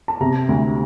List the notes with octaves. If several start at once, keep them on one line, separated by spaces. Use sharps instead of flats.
A5
C3 A#5
D2